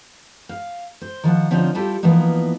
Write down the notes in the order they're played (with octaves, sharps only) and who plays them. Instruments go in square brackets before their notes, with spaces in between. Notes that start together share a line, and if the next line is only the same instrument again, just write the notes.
[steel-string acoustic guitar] F5
C5
D#3 F3 D5 F#5
D3 F3 C4 C#4 D#4 F4
G3 E4 F4 G4 A4
E3 F3 A#3 B3 D#4